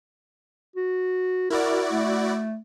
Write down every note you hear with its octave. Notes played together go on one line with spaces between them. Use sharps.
F#4
E4 F#4 A#4 D5
A3